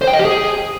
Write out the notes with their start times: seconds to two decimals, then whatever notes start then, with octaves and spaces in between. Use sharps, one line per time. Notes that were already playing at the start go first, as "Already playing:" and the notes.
0.02 C5
0.07 G5
0.13 D#5
0.19 G4
0.25 G#4